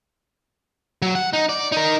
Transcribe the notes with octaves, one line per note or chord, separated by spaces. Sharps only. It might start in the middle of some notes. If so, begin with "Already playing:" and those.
F#3
F#5
D#4
D5
D#4 A#4